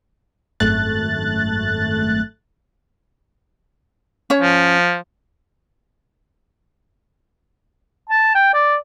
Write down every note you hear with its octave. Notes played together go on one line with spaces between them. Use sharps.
G#1 F#2 A3 F#6 A6
C#4 C#5
F3
A5
G5
D5